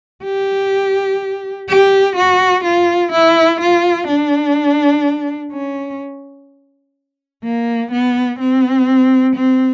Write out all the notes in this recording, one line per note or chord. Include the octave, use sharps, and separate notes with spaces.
G4
G4
F#4
F4
E4
F4
D4
C#4
A#3
B3
C4
C4